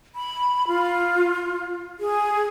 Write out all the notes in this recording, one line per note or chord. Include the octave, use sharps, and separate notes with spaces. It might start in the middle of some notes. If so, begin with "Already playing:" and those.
B5
F4
G#4